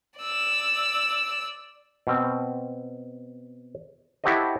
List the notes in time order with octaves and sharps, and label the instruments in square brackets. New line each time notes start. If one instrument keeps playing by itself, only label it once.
[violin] D5 E6
[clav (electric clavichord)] B2 C4
E4 F#4 G4 A4 C5 D#5